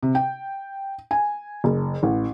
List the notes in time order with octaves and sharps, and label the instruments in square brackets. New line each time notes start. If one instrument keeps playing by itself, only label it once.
[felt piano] C3
G5
G#5
F#1
A1